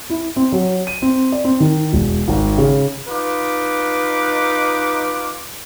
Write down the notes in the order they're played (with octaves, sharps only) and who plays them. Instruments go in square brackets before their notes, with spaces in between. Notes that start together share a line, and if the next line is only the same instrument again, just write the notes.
[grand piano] E4
C4
F#3
D#7
C4
D5
C4
D#3
E1
G#1
C#3
[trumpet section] D#4 F4 B4 D6